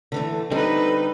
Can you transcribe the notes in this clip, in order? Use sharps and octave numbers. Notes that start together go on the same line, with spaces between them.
D3 E3 A3
D3 G3 C4 D#4 A4 B4 D#5